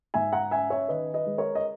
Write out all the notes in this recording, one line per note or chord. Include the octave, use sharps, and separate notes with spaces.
G#2 E5 G#5
F#5 A#5
C#4 E5 G#5
C#5 E5
D#3 B4 D#5
B4 D#5
G#3
A#4 C#5
D#5